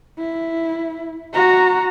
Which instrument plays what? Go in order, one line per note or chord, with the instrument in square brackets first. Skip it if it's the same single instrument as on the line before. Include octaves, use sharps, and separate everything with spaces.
[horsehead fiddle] E4
F#4 A#5